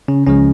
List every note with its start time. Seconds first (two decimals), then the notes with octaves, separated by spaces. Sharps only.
0.08 C#3 C#4
0.26 C#2 C#3 F3 G#3 C#4